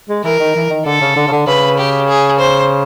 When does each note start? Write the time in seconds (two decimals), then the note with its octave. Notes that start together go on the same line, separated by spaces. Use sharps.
0.09 G#3
0.24 E3 A#4
0.40 D#3
0.55 E3
0.70 D#3
0.85 D3 A4
1.01 C#3
1.16 D3
1.28 C#3
1.32 D3
1.47 C#3 B4
1.78 G4
2.08 G#4
2.39 C5